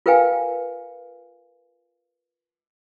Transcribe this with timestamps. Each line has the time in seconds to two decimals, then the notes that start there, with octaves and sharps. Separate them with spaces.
0.06 F4 A#4 B4 F5 G5 G#5